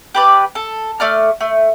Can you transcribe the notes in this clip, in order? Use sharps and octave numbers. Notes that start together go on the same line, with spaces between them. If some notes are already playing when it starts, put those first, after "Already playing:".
G4 B4 D5
A4
A3 D5 F6
A3